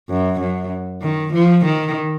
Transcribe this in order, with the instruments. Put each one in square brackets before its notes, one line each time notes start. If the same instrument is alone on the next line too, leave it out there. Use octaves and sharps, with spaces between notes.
[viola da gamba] F#2
F#2
D#3
F3
D#3